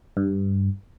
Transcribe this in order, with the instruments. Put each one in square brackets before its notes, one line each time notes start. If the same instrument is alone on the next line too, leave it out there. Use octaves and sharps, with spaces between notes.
[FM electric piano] G2